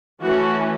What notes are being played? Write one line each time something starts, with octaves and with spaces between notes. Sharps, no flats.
E3 A3 C#4 F#4